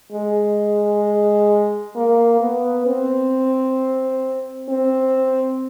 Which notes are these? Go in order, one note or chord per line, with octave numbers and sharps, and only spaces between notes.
G#3
A#3
B3
C4
C4